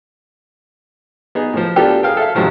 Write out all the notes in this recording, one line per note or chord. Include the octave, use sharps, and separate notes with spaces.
B3 D#4 G#4
A2 F3
B3 D4 F4 G4 A4 A#4
G#4 A#4 F5 G5
A4 E5 F5
G#2 C3 D#3 F3 F#3